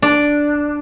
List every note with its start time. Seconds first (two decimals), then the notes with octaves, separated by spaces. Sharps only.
0.02 D4